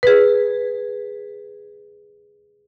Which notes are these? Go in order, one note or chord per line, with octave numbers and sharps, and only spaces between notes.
G#4 B4